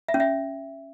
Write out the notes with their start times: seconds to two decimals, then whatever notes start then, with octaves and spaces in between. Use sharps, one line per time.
0.08 E5
0.14 C#4
0.20 E5